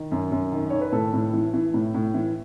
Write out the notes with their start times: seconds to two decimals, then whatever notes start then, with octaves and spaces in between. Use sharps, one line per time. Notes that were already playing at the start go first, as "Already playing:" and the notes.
Already playing: D#3
0.12 F#2
0.32 F#2
0.52 D#3
0.70 D#3 C#5
0.81 B4
0.92 A2 A4
1.13 A2
1.33 E3
1.54 E3
1.74 A2
1.94 A2
2.14 E3